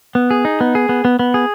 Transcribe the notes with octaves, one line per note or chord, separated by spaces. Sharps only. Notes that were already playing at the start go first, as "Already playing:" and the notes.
B3
G#4
D#4
B3
G#4
B3
B3
B3
G#4